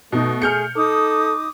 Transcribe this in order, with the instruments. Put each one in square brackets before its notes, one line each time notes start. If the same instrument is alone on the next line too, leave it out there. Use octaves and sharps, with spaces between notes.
[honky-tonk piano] B2 [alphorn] A3 [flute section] D#4
[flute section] G#4 [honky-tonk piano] F6 G6 C#7
[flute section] D#4 D6 D#6 [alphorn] A4